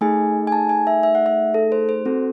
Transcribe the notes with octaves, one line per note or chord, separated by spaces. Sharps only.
A3 D#4 G#4 G#5
G#5
A5
G#5
E5
E5
F#5
E5
A4
C5
C5
C4 F#4 A4